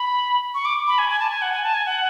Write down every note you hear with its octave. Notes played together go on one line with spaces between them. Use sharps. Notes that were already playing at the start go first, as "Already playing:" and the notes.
Already playing: B5
C#6
D6
B5
G#5
G#5
A5
G#5
F#5
G#5
A5
G#5
F#5